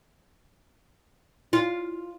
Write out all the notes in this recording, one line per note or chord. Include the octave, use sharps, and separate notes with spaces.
F4